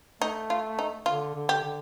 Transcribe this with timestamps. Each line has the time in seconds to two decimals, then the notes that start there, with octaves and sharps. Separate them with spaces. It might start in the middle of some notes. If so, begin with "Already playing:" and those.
0.21 A3 D#4
0.50 F4
0.79 D#4
1.06 D3 F4
1.35 D3
1.49 G4
1.64 D3